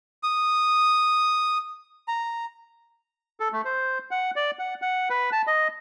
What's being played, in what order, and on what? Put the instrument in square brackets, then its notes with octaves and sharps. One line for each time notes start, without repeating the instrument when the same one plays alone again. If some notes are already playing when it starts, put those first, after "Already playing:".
[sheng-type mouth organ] D#6
A#5
[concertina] A4
A3
C5
F#5
D5
F#5
F#5
B4
A5
D#5